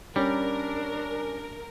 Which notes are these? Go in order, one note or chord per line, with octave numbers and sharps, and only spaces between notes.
G3 C#4 D4 A#4